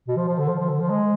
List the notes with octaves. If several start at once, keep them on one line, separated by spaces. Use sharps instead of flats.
B2
F3
F3
D3
F3
F3
D3
F3
G#3